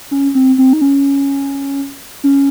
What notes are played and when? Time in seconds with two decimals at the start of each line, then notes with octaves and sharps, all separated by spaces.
0.11 C#4
0.35 C4
0.58 C4
0.73 D#4
0.81 C#4
2.24 C#4